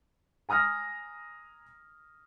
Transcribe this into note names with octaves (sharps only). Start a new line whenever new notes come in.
G#5 A#5 D#6 F6 A#6